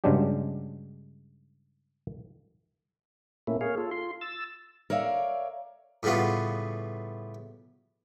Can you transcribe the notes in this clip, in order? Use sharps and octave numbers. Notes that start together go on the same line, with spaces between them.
G2 C#3 F#3 G#3 D4 G4
A#2 A3 A#3 C#4 E4
A#3 G#4 C#5 F5
F4 A4
F4 C6
E6 A6
A#4 C#5 D5 E5 F5
A2 C#3 G3 B3 F4